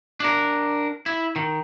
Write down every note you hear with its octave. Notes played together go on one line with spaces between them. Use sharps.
D4 A#4
E4
D#3